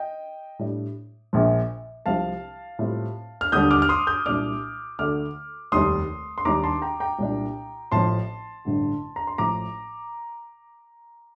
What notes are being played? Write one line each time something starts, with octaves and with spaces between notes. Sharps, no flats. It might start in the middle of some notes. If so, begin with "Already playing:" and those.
Already playing: D#5 G5
A2 G3 D4
A#1 A#2 F3
C2 C3 F3 F5 A5
A2 G3 C4 F4
F6
D#2 D3 G3 D#6 G6
D6 F6
F6
C6 D#6
D#6 G6
C2 A#2 G3 D4 D6 F6
D2 D3 A3 D4 D6 F6
F1 D#2 D#3 G3 C6 D#6
C6
D#2 D#3 G3 D4 A#5 D6
A5 C6
G5 A#5
G5 A#5
C2 A#2 G3 D4
A1 A2 F3 A5 C6
A1 G2 D3
A#5
C6
A1 A2 F3 A#5 D6